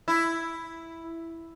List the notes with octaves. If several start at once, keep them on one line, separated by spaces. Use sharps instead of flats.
E4